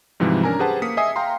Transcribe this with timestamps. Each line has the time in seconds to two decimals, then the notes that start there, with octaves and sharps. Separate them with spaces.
0.20 G#2 C3 E3 F3 G3 G#3
0.43 C#4 D4 A#4 G#5 A#5
0.59 G4 G#4 B4 C5 F#5 A5
0.82 A#3 D#6 B6 C#7
0.97 D#5 E5 G#5 D#6 C7
1.16 F5 G5 A#5 C6